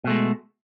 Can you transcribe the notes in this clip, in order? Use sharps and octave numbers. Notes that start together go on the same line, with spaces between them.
B2 G#3 A3